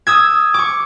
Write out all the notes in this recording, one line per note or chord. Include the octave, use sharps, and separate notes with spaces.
D#6 E6 G#6
C#6 D6